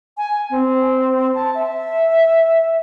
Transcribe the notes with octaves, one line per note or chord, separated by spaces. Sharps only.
G#5
C4
A5
E5